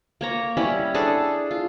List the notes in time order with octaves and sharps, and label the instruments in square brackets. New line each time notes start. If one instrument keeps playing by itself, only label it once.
[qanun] A#3 C#5 A#5
G3 C#4 E4 B5
D4 G#4 A4
F4